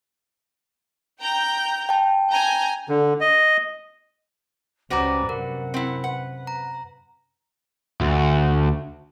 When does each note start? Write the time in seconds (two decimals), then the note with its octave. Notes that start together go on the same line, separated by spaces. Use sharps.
1.20 G5 A#5 G6
1.89 G5 A5
2.29 G#5 A#5 G6
2.89 D3
3.21 D#5
4.90 C#2 G3 C#4 F#4 B4 C5 A#5 D6
5.29 F#2 C3 A#4 F#5
5.74 C4 E4
6.04 B4 F#5
6.47 A#5
8.01 D2